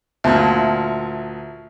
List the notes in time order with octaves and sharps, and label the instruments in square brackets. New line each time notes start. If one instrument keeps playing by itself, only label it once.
[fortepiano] D2 A#2 [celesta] E5 A5